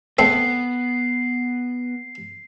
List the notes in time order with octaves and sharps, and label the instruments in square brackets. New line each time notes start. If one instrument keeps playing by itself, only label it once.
[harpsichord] A3 C4 [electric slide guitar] B3 [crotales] C7